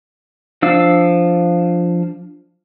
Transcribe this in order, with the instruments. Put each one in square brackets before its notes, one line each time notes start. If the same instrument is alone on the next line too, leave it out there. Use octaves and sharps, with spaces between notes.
[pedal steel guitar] F3 D4 F5 E6